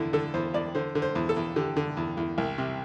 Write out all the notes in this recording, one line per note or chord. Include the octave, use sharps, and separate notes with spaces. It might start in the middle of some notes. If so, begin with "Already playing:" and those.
Already playing: E2 D3 E4
D3 A4
E2 C5
E2 D5
D3 C5
D3
C5
E2
A4
E2
D3 G4
D3
E2
E2
C2
C3